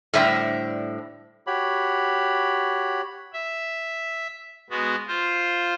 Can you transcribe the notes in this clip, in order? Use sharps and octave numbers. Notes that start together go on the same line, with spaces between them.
A2 D3 G3 C5 E5
F#4 G4 C#5 B5
E5
G#3 B3 F#4
F4 C5